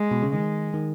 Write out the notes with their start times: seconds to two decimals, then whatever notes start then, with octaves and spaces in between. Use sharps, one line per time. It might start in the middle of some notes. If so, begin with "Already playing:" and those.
Already playing: G#3
0.11 B2
0.22 C#3
0.33 D#3 G#3
0.74 D#3